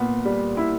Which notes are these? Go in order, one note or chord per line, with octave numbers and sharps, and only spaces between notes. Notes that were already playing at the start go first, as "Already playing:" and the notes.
Already playing: A#2 B3
G3
E4